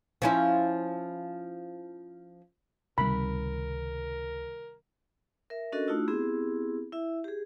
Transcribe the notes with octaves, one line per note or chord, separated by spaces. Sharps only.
F3 C#4 E4
C#2 C3 D#3 G3 A#4 B5
A#4 E5
C#4 D4 F#4 A4 A#4 D#5
A3 D4 D#4 F4 F#4 E6
B3 C4 E4 G4 G#4
E4 E5
G4 G#4